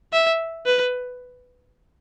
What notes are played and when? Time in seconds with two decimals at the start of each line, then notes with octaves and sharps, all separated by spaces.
0.13 E5
0.66 B4